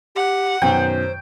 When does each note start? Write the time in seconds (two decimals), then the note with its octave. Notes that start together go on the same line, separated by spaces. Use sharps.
0.15 G4 F#5
0.62 F#2 B2 D#3 C5 G5